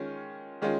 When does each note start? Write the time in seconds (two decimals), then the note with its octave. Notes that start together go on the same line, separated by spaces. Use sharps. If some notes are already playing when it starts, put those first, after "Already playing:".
Already playing: D#3 G#3 C#4 F4
0.62 D#3 G#3 C#4 F4